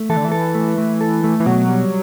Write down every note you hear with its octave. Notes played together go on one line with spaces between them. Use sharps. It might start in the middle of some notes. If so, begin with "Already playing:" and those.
Already playing: A3
E3 A4
D3
E3
A4
A3
A3
A4
A3
E3
B2 F#3
G3